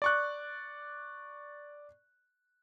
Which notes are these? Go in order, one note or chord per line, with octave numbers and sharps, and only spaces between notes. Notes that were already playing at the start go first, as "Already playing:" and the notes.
D5 C#6 F#6